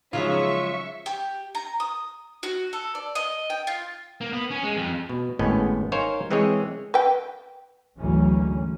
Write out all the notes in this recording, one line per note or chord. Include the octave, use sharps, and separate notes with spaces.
C#3 F3 F#3 G#3 D#4 F4 E5 C#6
G4
A#5
D#6
F#4
A4
D5
D#5
G5
F4
A#3
B3
C#4
G#3
F2
B2
G#1 A2 B3 C#4 D#5
D#4 A#4 C5 C#5 F5 G#5
E3 G#3 C4 G#4 C#5 D#5
B4 G5
G#1 D2 E3 F#3 A3 C#4